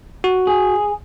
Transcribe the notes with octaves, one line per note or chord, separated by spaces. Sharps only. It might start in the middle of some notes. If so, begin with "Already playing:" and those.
F#4
G#4